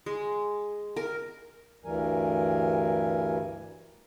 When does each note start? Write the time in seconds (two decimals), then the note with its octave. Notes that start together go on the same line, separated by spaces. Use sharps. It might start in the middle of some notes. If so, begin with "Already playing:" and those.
0.06 G#3
0.96 A#4
1.85 D2 G2 E3 G3 A#4 G#5